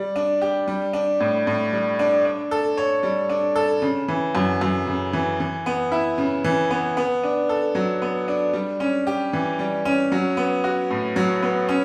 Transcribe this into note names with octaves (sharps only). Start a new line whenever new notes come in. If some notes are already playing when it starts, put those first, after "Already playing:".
Already playing: G3 D5
D4
G4
G3
D4
A2
A2
G3
D4
D4
A4
C#5
G3
D4
A4
C#3
E3
F#2
F#2
C#3
E3
E3
B3
E4
C#3
E3
B3
B3
D4
A4
F#3
B3
D4
G3
C#4
G4
E3
G3
C#4
F#3
B3
F#4
A2
F#3
B3
C#4